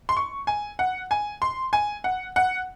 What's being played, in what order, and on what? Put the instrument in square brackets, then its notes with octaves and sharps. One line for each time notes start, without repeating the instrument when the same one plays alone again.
[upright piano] C6
C#6
G#5
F#5
G#5
C6
G#5
F#5
F#5